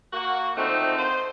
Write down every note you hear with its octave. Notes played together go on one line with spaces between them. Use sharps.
A#3 F#4
D3 D#3 F3 A3 C4 D#4
C5